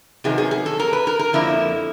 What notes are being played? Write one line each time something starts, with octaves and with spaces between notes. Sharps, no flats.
C3 D#3 F#3 B3 G#4
G#4
G#4
A4
A#4
B4
A#4
A#4
F2 D3 F3 A#3 E4